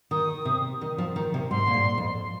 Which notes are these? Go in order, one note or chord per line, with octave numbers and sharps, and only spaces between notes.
D#3 D#6
C3
D#3
F3
D#3
C3
G#2 C6
A#2
G#2
F2